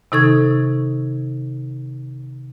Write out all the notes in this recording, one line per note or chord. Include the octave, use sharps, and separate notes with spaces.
C3 D#3 D#4 A4 C#6 G#6